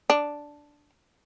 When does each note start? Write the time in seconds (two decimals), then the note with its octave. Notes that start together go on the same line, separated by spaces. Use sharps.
0.10 D4